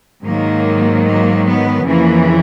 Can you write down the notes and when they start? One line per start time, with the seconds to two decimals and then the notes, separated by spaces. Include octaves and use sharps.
0.24 G#2 D#3 F#3 A#3
1.05 A#3
1.46 B3
1.86 F2 C#3 E3 A#3